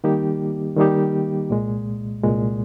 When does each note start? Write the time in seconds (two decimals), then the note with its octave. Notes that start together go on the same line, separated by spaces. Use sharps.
0.04 D#3 G3 A#3 D#4 G4
0.77 D#3 G3 A#3 D#4 G4
1.50 C2 A#2 G#3
2.23 C2 A#2 G#3